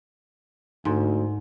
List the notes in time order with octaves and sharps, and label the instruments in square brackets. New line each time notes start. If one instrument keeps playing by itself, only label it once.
[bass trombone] D2 [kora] G#2